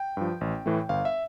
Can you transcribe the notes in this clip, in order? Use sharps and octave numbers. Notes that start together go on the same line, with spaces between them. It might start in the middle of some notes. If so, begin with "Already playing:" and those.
Already playing: G5
G2 F3
A1
A2 E3 A3
G1 F5
E5